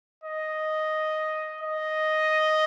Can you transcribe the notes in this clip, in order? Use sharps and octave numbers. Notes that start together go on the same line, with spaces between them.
D#5
D#5